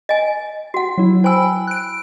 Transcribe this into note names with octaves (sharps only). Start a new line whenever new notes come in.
D#5 G#5
F#4 F#5
F#3 E4
C5 G5 G#5 B5 E6
F#6 D7